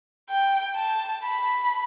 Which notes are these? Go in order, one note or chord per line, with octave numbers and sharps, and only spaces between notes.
G5
A5
B5